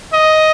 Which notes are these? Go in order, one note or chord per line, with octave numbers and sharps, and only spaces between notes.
D#5